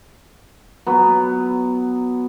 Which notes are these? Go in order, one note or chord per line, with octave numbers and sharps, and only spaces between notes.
F#3 B3